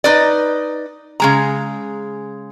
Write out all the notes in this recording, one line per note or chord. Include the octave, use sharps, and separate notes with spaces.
D#4 B4 D5
C#3 G#3 A#5